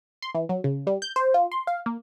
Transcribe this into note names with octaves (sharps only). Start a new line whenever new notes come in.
C6
E3
F#3
C#3
G3
G6
C5
F4
C6
F5
A#3